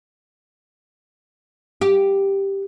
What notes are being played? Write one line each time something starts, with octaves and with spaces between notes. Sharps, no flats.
G4